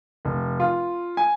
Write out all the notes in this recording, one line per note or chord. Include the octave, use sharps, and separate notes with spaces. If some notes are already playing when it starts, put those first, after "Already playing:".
F1
F4
G#5